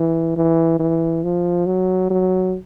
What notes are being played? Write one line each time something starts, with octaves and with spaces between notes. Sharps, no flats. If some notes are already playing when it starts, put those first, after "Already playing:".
Already playing: E3
E3
E3
F3
F#3
F#3